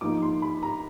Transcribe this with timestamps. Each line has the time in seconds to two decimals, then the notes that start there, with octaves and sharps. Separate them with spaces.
0.01 G#2 F3 A#3 D#4 D6
0.22 C6
0.42 B5
0.63 A#5